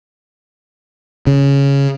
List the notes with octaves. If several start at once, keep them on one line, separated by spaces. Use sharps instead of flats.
C#3